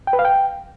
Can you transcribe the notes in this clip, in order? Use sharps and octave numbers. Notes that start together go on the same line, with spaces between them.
G5
B4
F5
G5